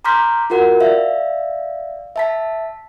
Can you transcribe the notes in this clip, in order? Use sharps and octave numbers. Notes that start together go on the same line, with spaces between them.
A#5 C6 D6 F6 G6 B6
F4 F#4 A#4 F#5
D5 E5 F5
E5 A5 B6